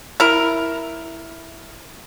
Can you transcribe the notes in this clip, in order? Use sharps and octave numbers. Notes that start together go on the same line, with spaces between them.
E4 A#4